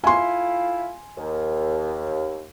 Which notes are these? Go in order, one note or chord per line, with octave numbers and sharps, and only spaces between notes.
A3 E4 F4 G#5 C6
D#2